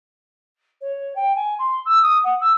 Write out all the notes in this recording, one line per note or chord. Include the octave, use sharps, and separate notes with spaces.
C#5
G5
G#5
C6
E6
D#6
F#5
E6